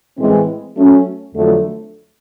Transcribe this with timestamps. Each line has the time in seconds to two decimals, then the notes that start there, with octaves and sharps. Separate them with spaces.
0.18 A2 E3 G#3 C4
0.77 F#3 A3 C#4
1.35 F2 D3 F#3 A3